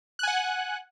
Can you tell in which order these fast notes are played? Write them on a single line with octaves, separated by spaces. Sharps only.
F#6 G#5 F#5